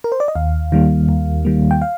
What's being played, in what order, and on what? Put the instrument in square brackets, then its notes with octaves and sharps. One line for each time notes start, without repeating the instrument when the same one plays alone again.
[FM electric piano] A#4
C5
D5
D#5
D#2 F5
D#3 G3 A#3
D#2
D#3 G3 A#3
G5
F5